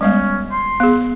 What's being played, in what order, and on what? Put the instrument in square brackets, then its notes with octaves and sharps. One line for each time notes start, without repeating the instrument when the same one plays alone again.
[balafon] G3 G#3 B3 [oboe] C#4
[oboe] C6
[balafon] B3 G#4